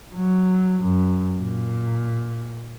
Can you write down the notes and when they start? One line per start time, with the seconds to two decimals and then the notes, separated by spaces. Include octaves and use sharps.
0.14 F#3
0.82 F#2
1.38 A#2